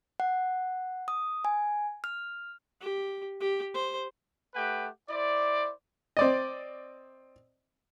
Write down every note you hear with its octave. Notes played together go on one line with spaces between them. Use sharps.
F#5
D#6
G#5
F6
G4
G4
C5
A3 G4 B4 F#5 G5
E4 C5 D5
C4 D5 D#5